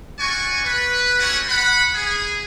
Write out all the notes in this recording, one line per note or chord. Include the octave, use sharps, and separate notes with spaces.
C#4 F#4 D5 G#5 C#6
B4
A3 C#4 F#4 G4 C#5 F#5
F#5 B5
G#4